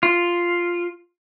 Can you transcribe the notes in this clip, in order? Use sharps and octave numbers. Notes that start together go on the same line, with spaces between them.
F4